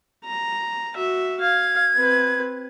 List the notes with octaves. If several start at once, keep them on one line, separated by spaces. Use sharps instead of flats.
A#5
F#4 E5
F5 G#6
C4 B4